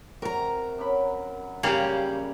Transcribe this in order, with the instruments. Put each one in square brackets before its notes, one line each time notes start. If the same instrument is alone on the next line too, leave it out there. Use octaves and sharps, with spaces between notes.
[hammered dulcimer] C3 F#4 [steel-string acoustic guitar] A#4 A#5
[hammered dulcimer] F#2 F#3 B5
[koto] C#3 G3 A#3 [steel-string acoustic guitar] G4 C#5